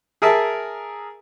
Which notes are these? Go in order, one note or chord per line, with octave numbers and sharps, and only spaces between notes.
G#4 A#4 E5 A5